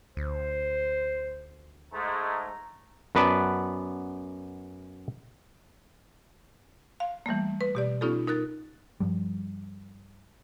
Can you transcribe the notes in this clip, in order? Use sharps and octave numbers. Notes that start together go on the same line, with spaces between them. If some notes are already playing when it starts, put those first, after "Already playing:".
D2 C5
G#2 G#3 A3 A#5
F#2 B3 B4 D5 A5
F5
E3 G3 A3 A#3
B4
B2 G4 D5
B3 C#4 D#4 F4 G4 A4
D#4 A#4 F#6 A6
G2 F3 G3